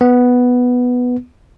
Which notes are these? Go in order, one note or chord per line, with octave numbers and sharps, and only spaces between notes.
B3